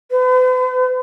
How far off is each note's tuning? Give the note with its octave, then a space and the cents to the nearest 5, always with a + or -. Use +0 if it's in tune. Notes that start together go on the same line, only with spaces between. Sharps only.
B4 +45